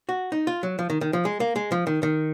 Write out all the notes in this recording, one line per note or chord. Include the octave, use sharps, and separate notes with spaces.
F#4
D#4
F4
F#3
F3
D#3
D#3
F3
G#3
A#3
G#3
F3
D#3
D#3